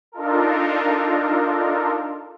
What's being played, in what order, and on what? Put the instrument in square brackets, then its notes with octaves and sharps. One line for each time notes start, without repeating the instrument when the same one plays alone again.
[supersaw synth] D4 D#4 F4 A4 A#4